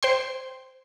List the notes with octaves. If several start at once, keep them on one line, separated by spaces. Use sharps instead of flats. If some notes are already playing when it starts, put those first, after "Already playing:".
C5 G5 C6